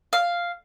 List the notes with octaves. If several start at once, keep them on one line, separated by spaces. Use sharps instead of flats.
F5